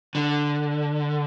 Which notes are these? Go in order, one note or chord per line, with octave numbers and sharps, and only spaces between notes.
D3